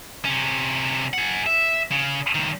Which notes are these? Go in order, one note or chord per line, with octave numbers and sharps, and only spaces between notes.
C3 C#4
G#4 F#5
E5
C#3
C#2 D#3